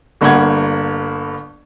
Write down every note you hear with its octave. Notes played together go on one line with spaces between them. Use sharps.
G1 G2 A#3 F#5 G#6